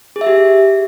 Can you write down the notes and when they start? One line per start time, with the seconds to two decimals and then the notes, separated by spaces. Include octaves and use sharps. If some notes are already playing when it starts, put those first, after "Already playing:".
0.16 G#4
0.21 E5
0.26 G4